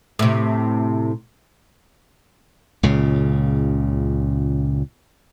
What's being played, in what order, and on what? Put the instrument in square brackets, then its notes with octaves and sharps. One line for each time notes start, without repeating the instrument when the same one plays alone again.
[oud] A2 C3
[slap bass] C#2 A#2 C#3